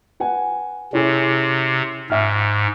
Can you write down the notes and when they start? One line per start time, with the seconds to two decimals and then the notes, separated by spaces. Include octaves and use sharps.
0.20 B4 F#5 G#5
0.93 C3 C#4 E4 G#4
2.10 G#2 E5 F6